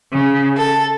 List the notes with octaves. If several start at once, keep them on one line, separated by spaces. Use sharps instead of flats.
C#3
A4